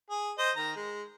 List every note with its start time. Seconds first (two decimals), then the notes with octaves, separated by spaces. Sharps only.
0.10 G#4
0.38 C5 D#5
0.56 D#3 A#5
0.75 G#3